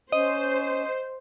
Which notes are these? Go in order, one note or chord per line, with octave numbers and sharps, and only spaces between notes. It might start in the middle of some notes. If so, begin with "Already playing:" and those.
C#4 C5 D#5